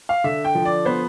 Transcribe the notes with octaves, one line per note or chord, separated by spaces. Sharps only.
F5
D3 E5
G5
F3
D5
B3 C5